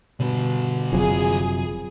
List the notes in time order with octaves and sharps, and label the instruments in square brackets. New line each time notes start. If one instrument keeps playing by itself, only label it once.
[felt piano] B2 [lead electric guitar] D3 G3
[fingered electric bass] F#1 C3 F#3 [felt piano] F3 [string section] G#4